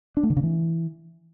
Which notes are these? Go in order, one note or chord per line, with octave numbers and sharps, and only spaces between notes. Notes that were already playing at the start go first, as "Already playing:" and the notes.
D4
A3
D3
C#3
E3